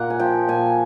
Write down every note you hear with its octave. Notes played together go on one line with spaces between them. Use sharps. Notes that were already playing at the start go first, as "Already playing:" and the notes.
Already playing: A#2 A#3 F#5
G#5
F3 G5
A#2 G#5